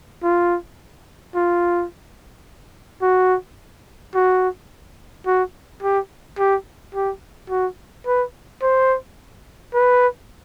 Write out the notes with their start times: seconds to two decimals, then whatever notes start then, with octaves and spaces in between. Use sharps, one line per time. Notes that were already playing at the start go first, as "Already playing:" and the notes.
0.23 F4
1.35 F4
3.02 F#4
4.15 F#4
5.26 F#4
5.83 G4
6.39 G4
6.95 G4
7.50 F#4
8.07 B4
8.63 C5
9.74 B4